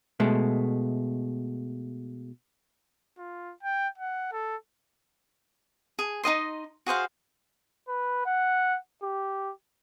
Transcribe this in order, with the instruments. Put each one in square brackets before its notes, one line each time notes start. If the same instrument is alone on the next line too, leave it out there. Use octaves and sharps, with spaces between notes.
[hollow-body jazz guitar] B2 G#3 A3
[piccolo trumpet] F4
G5
F#5
A4
[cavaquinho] G#4
D#4 F#4 D#5 C6
F#4 G#4 C5 F5
[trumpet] B4
F#5
G4